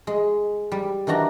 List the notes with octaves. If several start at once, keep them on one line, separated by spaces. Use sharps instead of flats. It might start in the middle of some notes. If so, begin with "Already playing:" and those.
G#3
G3
D#3 E3 D4 F#4 A#5